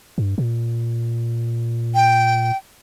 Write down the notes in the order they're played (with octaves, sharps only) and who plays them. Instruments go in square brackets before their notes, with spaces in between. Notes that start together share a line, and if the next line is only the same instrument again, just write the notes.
[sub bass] G2
A#2
[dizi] G5